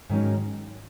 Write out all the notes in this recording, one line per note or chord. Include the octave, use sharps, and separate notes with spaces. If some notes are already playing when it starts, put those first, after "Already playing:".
G#2 D#3 F#3 C#4